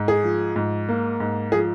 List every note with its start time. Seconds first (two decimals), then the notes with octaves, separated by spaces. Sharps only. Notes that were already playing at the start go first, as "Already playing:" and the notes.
Already playing: G#2
0.08 G#4
0.24 F3
0.56 G#2
0.89 A#3
1.20 G#2
1.52 F3 G#4